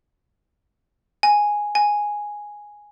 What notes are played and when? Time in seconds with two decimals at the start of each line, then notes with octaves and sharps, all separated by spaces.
1.23 G#5
1.75 G#5